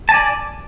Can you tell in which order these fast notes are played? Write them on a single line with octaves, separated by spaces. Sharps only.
A5 G#5 D5